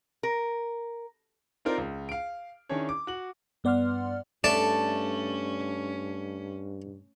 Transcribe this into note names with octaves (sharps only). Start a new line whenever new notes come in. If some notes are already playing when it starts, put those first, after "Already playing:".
A#4
C4 D#4 F4 A#4 D5 F5
C#2
F5 D7
D#3 C#4 D4 E4 G#4 C#5
D6
F#4 F#7
G2 B3 D5 F#5 C6 F6
G2 A3 C#4 D5 A5